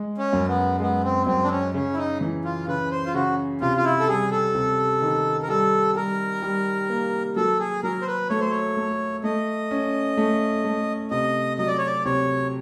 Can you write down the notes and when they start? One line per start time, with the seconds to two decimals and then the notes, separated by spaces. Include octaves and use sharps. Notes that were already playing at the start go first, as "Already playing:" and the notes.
Already playing: G#3
0.18 C#4
0.33 F#2
0.48 B3
0.80 G#3 B3
1.04 C4
1.27 F#2 C4
1.44 D4
1.50 C#4
1.74 C#3 C#4
1.93 E4
1.97 D#4
2.21 E3
2.45 F4
2.67 C#3 B4
2.91 C5
3.06 F4
3.14 C#3 F#4
3.61 C3 F4
3.77 F4
3.84 E4
3.99 A4
4.08 G3 G#4
4.31 A4
4.55 C3
5.02 D#3
5.43 A#4
5.48 G3 A4
5.96 G3 A#4
6.42 G3
6.89 A#3
7.36 F#3 A4
7.59 G#4
7.83 F#3 A#4
8.02 C5
8.07 B4
8.30 A3 C#5
8.40 C5
8.51 C#5
8.77 A3
9.24 A3 D#5
9.71 C#4
10.17 A3
10.65 A3
11.11 C3 D#5
11.58 F#3 D#5
11.67 D5
11.78 C#5
11.87 D5
12.05 C3 C#5